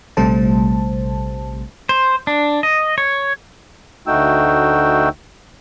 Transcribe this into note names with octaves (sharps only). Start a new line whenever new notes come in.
A#1 C3 G3 A3 C5 A5
C5
D4
D#5
C#5
D2 A3 D#4 F#4 G5 E6